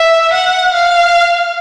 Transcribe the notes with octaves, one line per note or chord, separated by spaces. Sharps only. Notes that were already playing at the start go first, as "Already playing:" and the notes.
Already playing: E5
F#5
F5